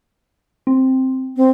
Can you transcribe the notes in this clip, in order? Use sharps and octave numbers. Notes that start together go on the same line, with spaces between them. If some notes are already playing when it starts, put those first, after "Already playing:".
C4
C4